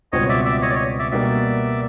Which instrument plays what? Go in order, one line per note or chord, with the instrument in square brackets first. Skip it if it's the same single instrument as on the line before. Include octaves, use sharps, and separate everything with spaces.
[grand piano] C#2 B2 G3 C4 [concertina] C#5 D#5
[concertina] D5 E5
D5 E5
C#5 D#5
D5
C#5 D#5
D5 E5
[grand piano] B2 G3 A#3 [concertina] D5 E5